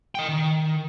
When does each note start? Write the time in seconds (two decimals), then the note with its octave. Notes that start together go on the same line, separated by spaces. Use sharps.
0.15 D#5 G5
0.29 D#3